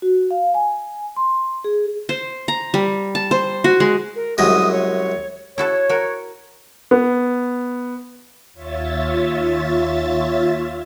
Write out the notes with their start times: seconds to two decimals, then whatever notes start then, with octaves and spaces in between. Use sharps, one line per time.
0.02 F#4
0.31 F5
0.54 G#5
1.16 C6
1.64 G#4
2.09 C5
2.48 A#5
2.74 G3
3.15 A5
3.31 C5
3.64 F#4
3.80 G#3
4.16 A#4
4.38 C2 F#2 G#3 D#6
4.72 C#5
5.58 E4 F#4 A4 C#5
5.89 F#4 A#4
6.91 B3
8.53 D#2 F4 C#5 E5 A6